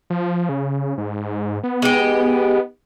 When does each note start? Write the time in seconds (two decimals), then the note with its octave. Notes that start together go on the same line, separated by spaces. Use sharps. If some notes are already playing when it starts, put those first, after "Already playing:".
0.10 F3
0.49 C#3
0.98 G#2
1.63 B3
1.82 G#3 D#4 G4